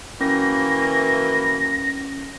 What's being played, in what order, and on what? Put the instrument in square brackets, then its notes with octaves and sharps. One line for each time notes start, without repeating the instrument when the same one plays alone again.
[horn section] E3 F#3 A#3 [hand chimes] C#4 [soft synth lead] A#6